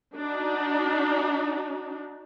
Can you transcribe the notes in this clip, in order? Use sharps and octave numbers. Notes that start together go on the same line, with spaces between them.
D4 D#4 F#4